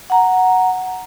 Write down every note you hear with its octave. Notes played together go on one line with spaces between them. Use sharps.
F#5 A#5